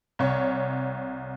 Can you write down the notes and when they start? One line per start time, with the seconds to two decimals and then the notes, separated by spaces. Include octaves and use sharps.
0.19 C2 C#5